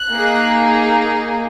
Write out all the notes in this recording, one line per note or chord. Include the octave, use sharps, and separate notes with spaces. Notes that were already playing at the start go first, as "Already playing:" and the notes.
Already playing: F#6
A#3 D#4 G#4